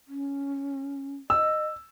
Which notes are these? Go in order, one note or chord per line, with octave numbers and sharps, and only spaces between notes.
C#4
D#5 E6